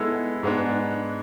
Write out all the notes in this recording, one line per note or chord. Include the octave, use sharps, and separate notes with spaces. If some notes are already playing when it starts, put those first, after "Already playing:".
Already playing: G#3 B3 E4 A4
G#2 G#3 B3 D4